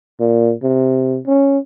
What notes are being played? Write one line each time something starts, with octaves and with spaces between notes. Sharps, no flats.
A#2
C3
C#4